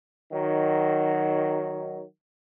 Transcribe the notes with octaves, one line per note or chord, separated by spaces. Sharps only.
D#3 F#3